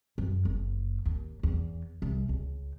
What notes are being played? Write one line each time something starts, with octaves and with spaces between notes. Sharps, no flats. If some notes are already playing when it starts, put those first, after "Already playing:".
F#2
F#1
D#2
E2
C2
C#2